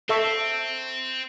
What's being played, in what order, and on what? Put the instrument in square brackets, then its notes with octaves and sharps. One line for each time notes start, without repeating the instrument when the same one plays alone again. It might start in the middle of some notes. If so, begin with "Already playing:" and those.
[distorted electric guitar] C4 [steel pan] A4 E5 C#6